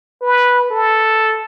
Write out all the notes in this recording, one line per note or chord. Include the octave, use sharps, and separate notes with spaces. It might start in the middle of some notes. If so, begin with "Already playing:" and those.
B4
A4